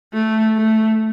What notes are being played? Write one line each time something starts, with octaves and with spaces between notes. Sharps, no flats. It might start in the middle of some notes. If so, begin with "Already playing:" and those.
A3
A3